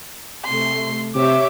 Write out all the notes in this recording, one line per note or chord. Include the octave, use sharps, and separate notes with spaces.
C3 A3 C6
C3 G4 C#5 E5 D6